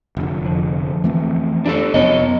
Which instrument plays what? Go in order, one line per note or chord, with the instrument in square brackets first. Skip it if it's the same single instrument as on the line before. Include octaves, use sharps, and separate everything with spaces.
[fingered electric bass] F1 D3
[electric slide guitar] F2
[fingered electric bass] E3 A3 C4
[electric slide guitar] D4 G4 A4
[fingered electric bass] F1 F#2 [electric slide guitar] B3 C#5 D#5